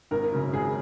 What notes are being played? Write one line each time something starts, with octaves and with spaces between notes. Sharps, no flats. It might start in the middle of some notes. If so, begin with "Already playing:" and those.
G#1 A#4
F#2 C#3 F#3
G#1 G#4